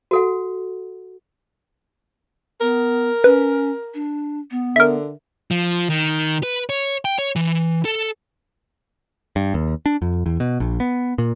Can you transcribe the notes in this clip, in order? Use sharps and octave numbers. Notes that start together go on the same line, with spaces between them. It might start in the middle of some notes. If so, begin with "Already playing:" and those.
F#4 A4 F#5
B3 A#4
C#4 B4
D4
B3
D3 A#4 E5
F3
D#3
B4
C#5
G5
C#5
E3
A4
G2
D#2
D4
F2
E2
B2
A#1
B3
A#2